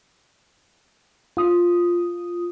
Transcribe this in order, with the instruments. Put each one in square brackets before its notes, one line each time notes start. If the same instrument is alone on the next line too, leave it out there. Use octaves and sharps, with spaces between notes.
[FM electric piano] F4 D#6